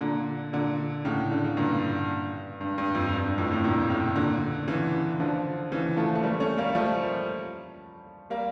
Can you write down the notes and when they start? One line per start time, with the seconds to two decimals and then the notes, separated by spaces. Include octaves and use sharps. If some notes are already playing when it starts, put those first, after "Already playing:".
0.01 A#2 D3
0.53 A#2 D3
1.05 A2 C#3
1.32 D3
1.44 C#3
1.57 G2 A#2
2.61 G2
2.78 G2
2.95 F2
3.13 G2
3.25 G2
3.38 F2 A2
3.51 A2 C#3
3.64 G2 A#2
3.90 A2 C#3
4.16 A#2 D3
4.68 C#3 E3
5.20 D3 F3
5.72 C#3 E3
5.97 F3 A3
6.15 A3
6.23 G3 A#3
6.40 A3 C#4
6.58 G3 A#3
6.75 F3 A3
8.30 G3 A#3